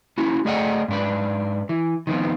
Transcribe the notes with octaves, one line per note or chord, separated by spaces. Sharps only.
A#3 C#4 E4 F#4
A3 G#4 D5 D#5 F#5 G5
G#2 D4 B4
E3
D#3 F3 B3 C4